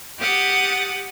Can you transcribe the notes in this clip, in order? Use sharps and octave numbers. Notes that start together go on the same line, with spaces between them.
G4 F#5 D#6 A6